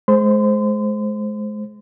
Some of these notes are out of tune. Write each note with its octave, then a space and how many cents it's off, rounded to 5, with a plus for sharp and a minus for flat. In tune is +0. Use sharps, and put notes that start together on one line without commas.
G#3 +30 C5 +0 C6 -35